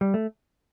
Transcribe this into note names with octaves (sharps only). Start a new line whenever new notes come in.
G3
A3